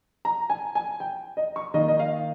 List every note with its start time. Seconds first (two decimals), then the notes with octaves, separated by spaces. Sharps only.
0.25 A#5
0.50 G#5
0.75 G#5
1.00 G5
1.37 D#5
1.56 C#6
1.74 D#3 A#3 D#5
1.88 D#5
1.99 F5